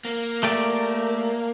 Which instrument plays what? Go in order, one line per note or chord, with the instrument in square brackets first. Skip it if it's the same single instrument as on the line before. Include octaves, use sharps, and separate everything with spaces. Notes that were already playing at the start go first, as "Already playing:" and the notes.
[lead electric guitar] A#3
[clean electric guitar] A3 G4 D5